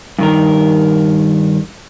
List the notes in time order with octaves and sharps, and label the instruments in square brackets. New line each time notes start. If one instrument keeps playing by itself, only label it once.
[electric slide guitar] G2 D#3 A#4